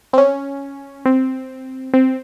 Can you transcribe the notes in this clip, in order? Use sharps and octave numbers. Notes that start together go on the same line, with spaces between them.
C4
C#4
C4
C4